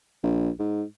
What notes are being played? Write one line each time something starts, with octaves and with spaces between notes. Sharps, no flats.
A#1
G#2